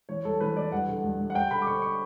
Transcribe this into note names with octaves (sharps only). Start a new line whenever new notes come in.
E3 C#5
G2 A4
E3 B4
E3 D5
G2 F#5
D3
G2
G2
F#5
G2 G5
D3 B5
D6
D3 C#6
C#6